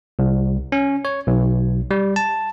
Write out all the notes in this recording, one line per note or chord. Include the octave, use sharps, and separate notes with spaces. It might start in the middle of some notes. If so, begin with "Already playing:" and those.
C2
C#4
C#5
B1
G3
A5